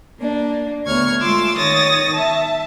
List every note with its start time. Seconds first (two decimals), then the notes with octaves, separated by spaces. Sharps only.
0.20 A#3 D4
0.86 D2 B3 C#5 C#6 F6 G#6
1.21 G#3 A3 F4 C6 D6 E6
1.58 D#3 C#5 D#6 A6 A#6
2.14 E5 A5